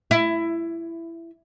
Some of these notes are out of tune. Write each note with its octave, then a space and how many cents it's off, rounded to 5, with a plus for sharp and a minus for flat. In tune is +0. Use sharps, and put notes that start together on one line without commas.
E4 +15